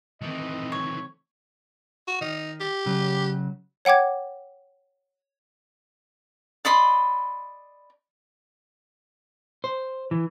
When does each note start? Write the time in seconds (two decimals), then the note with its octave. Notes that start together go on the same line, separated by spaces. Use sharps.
0.22 D#3 E3 A3 C4 D#5
0.72 C#5
2.08 F#4
2.21 D#3 D#4
2.60 G4
2.86 C#3 F#3
3.85 C#5 F#5 G5 D6 G#6
6.65 D5 D#5 B5 C6
9.64 C5
10.11 E3